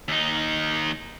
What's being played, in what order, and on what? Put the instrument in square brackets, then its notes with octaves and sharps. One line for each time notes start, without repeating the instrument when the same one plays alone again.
[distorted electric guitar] D#2 D#4